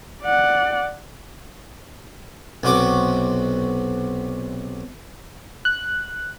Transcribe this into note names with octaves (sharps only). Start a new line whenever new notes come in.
D5 F#5
B1 C3 F#4 D6
F#6